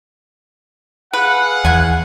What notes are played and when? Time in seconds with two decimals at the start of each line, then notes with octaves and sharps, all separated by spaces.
1.13 G#4 B4 F5 F#5
1.65 E2 B3 G#5